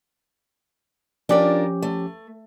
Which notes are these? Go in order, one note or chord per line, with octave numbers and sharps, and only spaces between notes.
F3 C#4 D4 F4 G4 A#4
A3